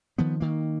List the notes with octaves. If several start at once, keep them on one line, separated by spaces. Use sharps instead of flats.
D#3 F3 B3
D#3 A#3